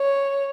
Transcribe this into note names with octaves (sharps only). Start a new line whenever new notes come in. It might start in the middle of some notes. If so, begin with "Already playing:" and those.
Already playing: C#5